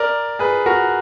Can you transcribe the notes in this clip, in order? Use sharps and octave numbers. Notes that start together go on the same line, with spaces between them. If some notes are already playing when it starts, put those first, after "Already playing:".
Already playing: A#4 D5
G#4 B4
F#4 A#4